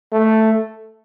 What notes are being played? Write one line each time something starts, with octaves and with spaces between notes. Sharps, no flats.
A3